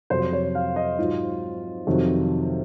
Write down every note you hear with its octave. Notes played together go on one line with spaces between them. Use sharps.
F2 C3 F#3 C5
C#5
F5
D#5
G#2 F#3 F4
F2 C3 D#3 F#3